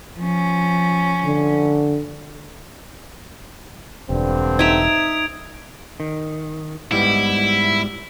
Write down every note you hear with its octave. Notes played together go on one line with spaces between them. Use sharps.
F3 C#4
D3
E1 G2 D3 C4
D#4 E5 G#6 D7 F7
D#3
G#2 G3 B3 E4